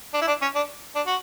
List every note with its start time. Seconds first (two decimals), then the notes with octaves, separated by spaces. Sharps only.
0.14 D4
0.21 E4
0.28 D4
0.42 C#4
0.55 D4
0.95 D4
1.07 F#4